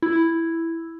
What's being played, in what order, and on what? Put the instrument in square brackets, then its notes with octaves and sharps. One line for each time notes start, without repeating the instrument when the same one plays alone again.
[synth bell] E4